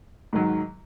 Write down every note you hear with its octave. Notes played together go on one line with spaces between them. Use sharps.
G#2 D#3 F#3